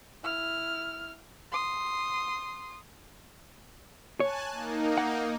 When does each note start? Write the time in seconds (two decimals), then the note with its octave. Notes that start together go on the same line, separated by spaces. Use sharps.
0.23 E4 F6
1.52 C6 D#6
4.20 C#5 G#5 A5 F#6
4.51 A#3 D#4
4.98 F#5